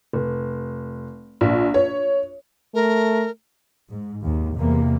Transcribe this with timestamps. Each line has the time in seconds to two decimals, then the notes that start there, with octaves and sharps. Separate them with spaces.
0.13 F1
1.41 A#1
1.74 C#5
2.75 A3 A#4
3.89 G#2
4.23 D#2 G#2
4.57 E2 C3 A#3